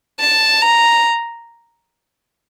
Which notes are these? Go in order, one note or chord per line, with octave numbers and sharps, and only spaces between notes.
A5
A#5